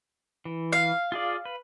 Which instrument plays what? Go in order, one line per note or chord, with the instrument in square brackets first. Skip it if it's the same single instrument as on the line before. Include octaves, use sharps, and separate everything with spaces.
[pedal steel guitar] E3
[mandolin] F5
[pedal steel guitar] F4 G#4 D5
B4